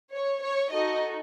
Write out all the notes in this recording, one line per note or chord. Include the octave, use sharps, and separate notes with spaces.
C#5
C#5
D#4 F#4 A4 D#5